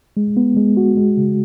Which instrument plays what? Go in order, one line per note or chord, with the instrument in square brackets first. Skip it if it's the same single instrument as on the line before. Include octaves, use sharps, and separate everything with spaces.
[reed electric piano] G#3
B3
G#3
F#4
G#3
C#3